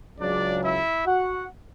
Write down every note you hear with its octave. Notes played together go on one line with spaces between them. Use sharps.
C#2 C#3 F#3 D4 D5
E4 E5
F#4 F#5